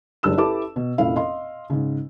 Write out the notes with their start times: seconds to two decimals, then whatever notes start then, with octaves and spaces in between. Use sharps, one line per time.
0.23 F#1 D4 G4 E6 E7
0.37 E4 G4 A4 B4 A5 D6
0.76 B2
0.98 F1 A#2 C#4 E4 F5
1.16 D#5 F5 C6
1.70 G#2 C#3